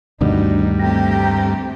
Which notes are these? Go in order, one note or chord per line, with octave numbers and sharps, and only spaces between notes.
D2 G2 B2 D#3 D4 D#4
A3 C4 G4 G5 A#5